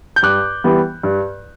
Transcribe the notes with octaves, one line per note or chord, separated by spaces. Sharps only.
G6
G2 D6 F#6
E3 G3 B3
G2